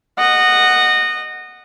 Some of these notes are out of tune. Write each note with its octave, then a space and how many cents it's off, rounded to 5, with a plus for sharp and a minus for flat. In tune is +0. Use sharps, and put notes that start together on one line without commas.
D#5 -20 F#5 +0